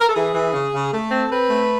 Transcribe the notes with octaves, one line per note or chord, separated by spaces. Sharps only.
A#4
A4
E3 G#4
E3
C#3
C#3
A3 A4
C4
C4 B4
A3